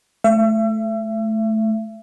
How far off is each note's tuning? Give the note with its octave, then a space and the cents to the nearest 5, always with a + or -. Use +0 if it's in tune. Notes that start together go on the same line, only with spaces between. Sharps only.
A3 -15 E5 +35